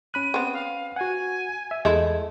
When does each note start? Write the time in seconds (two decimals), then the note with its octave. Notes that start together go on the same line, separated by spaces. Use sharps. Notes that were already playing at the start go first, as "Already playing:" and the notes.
0.14 C#4 B5 F#6 D#7
0.34 B3 C4
0.54 F5
0.96 F#4 F#5 G#5
1.71 E5
1.85 E2 G#3 A3 E4 G#6